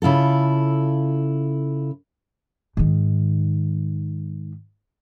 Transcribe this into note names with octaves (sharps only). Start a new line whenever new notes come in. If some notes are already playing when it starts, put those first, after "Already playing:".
C#3 E4 F4 A4
G#2 D#3